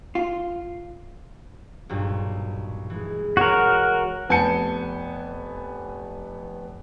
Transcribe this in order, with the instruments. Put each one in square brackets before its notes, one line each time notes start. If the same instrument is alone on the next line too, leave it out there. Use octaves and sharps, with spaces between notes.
[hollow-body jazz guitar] F4
[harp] B1 G2 A#2
E3 G#3
[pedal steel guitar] F#4 A#4 [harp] C#5
[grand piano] F1 B3 G#5 A5 G6 C#7